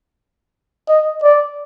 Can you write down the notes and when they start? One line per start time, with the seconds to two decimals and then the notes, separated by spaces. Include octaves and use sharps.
0.89 D#5
1.23 D5